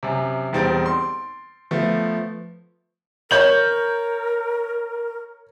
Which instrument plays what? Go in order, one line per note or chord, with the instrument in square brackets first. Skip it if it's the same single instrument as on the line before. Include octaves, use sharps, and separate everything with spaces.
[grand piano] F#2 C3
E1 G3 C4 D#4 A6 D7
C6
F3 A3 B3
[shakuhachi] A#4 [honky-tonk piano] C#5 G6 F#7